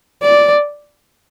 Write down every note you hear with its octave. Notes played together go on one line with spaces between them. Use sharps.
D5